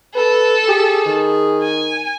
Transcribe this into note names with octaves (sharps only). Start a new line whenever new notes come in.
A4 B4
G4 G#4
D#3
G#5